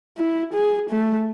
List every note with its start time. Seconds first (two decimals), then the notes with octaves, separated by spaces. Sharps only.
0.18 E4
0.53 G#4
0.90 A3